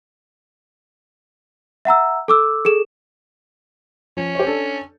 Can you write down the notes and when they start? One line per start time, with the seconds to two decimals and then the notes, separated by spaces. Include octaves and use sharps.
1.85 E5 F#5 A#5 E6
2.28 A4 D6 E6
2.65 G#4 A4 E7
4.17 F3 C#4
4.35 G4 C5 C#5
4.47 D4 A4